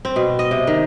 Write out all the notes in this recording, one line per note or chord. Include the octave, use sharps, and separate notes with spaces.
C4
B2
D#5
C3
D#3